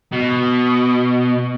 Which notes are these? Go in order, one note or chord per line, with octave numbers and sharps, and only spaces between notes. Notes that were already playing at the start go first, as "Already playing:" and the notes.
B2